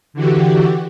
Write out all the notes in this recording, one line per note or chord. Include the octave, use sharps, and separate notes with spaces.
D3 E3 F#4 G4